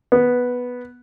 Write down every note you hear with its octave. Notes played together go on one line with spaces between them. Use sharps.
B3